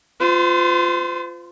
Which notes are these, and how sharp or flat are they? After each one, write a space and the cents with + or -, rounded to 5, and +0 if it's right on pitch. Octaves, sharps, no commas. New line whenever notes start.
F4 +0 C5 -40